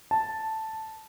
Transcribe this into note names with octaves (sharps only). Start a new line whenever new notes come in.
A5